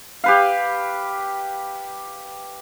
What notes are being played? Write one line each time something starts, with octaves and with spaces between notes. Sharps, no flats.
G4 B4 F5